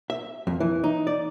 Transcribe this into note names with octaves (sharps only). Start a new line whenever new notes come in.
E5
F2
E3
D#4
D5